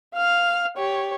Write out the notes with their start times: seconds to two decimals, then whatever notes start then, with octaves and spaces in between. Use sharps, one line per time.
0.14 F5 F6
0.76 G4 C#5